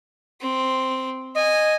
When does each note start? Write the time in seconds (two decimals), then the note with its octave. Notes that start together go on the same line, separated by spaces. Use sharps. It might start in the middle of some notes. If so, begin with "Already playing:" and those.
0.41 C4
1.36 D#5 G#5